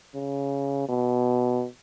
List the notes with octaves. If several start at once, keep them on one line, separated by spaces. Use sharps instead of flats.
C#3
B2